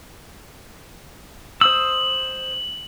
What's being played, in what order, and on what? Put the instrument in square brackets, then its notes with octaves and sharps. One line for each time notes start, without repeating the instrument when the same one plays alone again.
[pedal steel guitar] C5 D#6 E6 [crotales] F#7